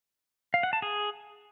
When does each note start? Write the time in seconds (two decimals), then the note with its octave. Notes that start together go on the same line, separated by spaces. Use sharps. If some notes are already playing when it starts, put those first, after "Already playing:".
0.54 F5
0.63 F#5
0.73 A5
0.82 G#4